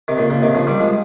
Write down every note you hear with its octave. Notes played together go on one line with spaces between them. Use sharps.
C3 D#3
A#2 C#3
A#2 C#3
C3 D#3
C#3 F3
D#3 G3
F3 G#3